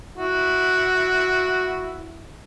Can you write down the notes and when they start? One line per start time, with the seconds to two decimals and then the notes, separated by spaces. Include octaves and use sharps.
0.18 E4 F#4